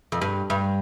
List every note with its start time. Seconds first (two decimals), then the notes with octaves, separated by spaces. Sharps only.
0.12 F2
0.21 G2
0.50 G2